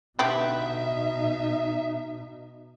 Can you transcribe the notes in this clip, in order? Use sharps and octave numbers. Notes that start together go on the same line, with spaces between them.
B2 D3 D#4 G4 B4 E5